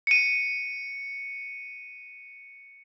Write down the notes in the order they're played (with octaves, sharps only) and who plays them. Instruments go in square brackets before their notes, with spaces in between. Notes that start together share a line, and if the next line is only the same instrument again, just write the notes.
[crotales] C#7 D#7